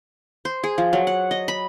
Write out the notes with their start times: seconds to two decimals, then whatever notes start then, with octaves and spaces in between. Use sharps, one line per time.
0.45 C5
0.64 G#4
0.78 F3
0.93 F#3
1.07 F#5
1.31 D#5
1.48 B5